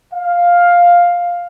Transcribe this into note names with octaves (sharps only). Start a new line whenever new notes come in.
F5